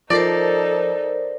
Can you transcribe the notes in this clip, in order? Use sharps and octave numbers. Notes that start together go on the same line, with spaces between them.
F3 D#4 A4 A#4 C5 D5